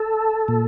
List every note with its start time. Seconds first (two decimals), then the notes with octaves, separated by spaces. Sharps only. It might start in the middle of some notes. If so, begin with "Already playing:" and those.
Already playing: A4
0.48 A#2